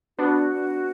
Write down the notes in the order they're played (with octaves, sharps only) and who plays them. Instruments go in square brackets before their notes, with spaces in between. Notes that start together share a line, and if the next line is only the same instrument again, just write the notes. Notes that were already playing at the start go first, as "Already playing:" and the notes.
[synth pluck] B3 D4 [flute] F#4